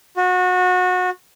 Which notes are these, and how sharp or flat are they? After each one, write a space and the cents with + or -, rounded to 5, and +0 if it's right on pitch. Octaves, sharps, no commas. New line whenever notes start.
F#4 -25